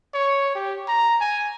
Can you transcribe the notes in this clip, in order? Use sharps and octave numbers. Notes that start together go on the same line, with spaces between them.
C#5
G4
A#5
G#5